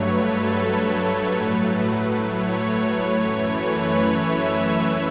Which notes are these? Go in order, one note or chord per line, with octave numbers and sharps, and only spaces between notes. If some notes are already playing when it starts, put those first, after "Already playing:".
Already playing: G2 F#3 A3 B4 C#5
A4
B4
A2 F#3 A3
C#5
F#2 E3 A3 C#5
B4
C#5
E5